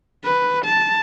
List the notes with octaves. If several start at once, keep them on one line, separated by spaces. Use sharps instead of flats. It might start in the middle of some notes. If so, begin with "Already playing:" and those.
B4
A5